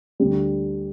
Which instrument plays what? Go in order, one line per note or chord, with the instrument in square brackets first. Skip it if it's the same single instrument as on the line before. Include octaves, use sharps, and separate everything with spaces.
[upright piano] D2 D3 G3